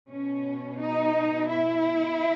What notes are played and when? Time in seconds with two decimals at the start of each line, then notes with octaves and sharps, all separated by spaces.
0.11 B2 C#4
0.81 D#4
1.50 E4